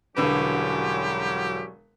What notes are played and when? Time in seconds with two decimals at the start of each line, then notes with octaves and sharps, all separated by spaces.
0.17 E1 D3 F#3 G3 C#4 G4 B4